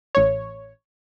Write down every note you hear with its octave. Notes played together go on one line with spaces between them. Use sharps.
A1 C#5